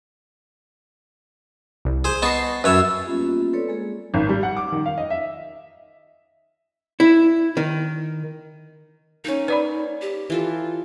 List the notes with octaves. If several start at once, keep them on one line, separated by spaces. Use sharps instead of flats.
C2
G#4 C5
B3 D#5 A5 C#6 C7
F#2 B4 C#5 E5 A5
G3 A#3 B3 C#4 F4 G4
C4 A4 B4 C#5 D5
G#3 A#3 G#4
G#1
G3
F#5
D6
D#3
F5
D#5
E5
E4
D#3
A#3 C#4 D#4
B4 D5 G#5 B5
G4
E3 F4 A4